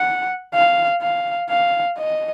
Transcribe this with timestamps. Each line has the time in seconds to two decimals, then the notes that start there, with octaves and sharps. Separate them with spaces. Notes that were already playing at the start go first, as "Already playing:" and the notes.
Already playing: F#5
0.54 F5
1.02 F5
1.49 F5
1.98 D#5